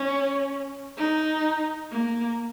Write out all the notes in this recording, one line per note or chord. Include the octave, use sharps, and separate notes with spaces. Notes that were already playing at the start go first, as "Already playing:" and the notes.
Already playing: C#4
D#4
A#3